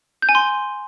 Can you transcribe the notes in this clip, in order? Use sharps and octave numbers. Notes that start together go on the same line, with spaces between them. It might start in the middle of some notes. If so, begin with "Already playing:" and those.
G6
G#5
C6